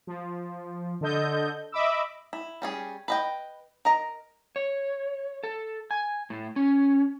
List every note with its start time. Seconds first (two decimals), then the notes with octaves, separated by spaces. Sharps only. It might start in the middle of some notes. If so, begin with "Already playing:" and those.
0.07 F3
1.01 D3 A4 D#5 G6
1.72 D#5 E5 B5 D6 E6
2.33 E4
2.62 G3 C#4 G#4
3.08 B4 D#5 G5
3.85 A#4 D#5 A#5
4.56 C#5
5.44 A4
5.91 G#5
6.30 A2
6.56 C#4